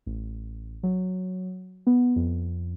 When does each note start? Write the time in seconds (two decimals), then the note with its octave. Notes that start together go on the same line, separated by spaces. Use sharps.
0.06 A1
0.83 F#3
1.87 B3
2.16 F2